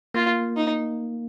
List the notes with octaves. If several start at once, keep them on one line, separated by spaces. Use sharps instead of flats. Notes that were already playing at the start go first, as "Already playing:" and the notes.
A#3 F4
D#4